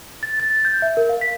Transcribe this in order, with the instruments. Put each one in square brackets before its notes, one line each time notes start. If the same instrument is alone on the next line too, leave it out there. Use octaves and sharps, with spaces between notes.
[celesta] A6
A6
G6
E5
A#4
F5
B6